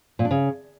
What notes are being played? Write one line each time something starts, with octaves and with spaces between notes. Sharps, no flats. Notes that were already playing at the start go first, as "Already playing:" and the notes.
A#2
D4
C#3